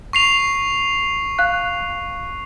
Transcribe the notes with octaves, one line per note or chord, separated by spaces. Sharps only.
C#6 C7 F7
F5 F#6